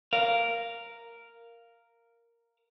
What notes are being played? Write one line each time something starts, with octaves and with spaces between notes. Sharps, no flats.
A#4 F5